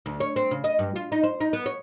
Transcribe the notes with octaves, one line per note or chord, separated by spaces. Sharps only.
D2
C#5
C4
C#3
D#5
G2
F4
D#4
C5
D#4
B3
C#5